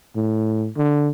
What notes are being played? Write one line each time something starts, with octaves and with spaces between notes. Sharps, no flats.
A2
D3